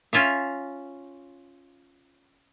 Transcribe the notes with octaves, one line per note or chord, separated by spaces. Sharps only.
C#4 F4 E5 F5